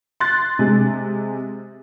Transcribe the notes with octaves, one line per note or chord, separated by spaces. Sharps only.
C6 F#6 A6
C3 G#3